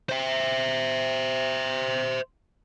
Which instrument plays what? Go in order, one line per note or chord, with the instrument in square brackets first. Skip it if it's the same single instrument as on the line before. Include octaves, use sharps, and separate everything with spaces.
[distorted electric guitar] C5 E5